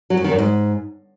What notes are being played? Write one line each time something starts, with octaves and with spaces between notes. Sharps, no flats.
F#3
F#2
D#3
F#2
G#2